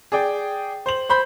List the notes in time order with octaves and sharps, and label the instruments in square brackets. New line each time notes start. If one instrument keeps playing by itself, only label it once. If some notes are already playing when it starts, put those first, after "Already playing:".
[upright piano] G#4 D5 G5
C5 F#7
C5 B5 G6